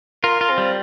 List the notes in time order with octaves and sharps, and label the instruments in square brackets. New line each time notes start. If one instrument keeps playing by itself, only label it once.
[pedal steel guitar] F4 [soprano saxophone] A#4
[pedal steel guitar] F4
[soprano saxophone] C4
[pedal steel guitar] G3